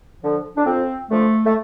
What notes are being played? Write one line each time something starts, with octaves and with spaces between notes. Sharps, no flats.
D3 F3
D4
F2 C4
D3 F3 A3
A3